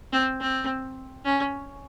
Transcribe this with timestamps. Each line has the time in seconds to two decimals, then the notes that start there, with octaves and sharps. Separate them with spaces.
0.13 C4
0.41 C4
1.25 C#4